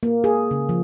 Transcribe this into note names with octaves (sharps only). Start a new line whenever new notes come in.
A#3
G#4
C#3
F3